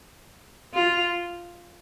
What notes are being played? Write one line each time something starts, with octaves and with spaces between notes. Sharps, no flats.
F4